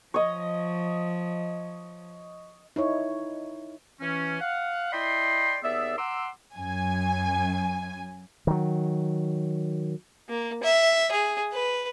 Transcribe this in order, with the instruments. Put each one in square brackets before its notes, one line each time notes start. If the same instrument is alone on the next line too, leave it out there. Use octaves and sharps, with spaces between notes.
[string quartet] F3 [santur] C#5 D#5
[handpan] D#4 E4 C#5
[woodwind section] E3 C#4
F5 F#5
E4 D5 D#5 G5 B5 C6
D#2 B3 G#4 D5 E5
F#5 A#5 C6 D6 E6
[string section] F#2 G#5
[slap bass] D#3 F#3
[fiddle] A#3
E5
G#4
B4